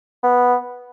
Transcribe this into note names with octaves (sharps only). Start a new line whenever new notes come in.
B3